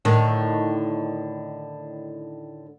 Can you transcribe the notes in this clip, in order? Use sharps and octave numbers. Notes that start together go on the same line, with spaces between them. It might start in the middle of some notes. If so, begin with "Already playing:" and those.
A2 D3 D#3